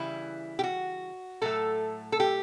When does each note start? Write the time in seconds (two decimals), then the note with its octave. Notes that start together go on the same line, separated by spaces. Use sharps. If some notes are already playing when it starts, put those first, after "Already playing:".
Already playing: C#3 E3 G3 E4
0.59 G4
0.63 F#4
1.42 A2 F#3 A3 A4
2.12 A4
2.20 G4